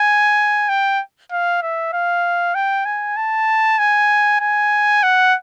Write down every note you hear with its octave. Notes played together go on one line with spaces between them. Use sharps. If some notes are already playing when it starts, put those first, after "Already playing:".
Already playing: G#5
G5
F5
E5
F5
G5
G#5
A5
G#5
G#5
F#5